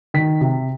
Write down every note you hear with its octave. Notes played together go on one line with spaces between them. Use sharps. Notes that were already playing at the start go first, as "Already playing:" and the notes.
D#3 B6
C3